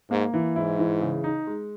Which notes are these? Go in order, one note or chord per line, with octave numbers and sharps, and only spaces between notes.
G#2 A#3
E3
G#2 E4
E3
C#3
D#4
G#3